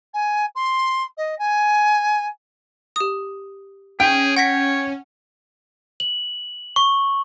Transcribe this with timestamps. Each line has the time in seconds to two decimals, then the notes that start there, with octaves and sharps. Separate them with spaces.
0.14 G#5
0.55 C6
1.17 D#5
1.39 G#5
2.96 G4 D#6
4.00 C#4 G#4 G5
4.37 C#5 F#5 A#6 B6
6.00 F#7
6.76 C#6